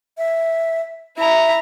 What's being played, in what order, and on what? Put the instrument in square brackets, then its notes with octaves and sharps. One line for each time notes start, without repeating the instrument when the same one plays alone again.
[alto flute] E5
[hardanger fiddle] E4 A#5 [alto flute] E5